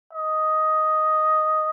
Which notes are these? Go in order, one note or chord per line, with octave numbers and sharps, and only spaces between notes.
D#5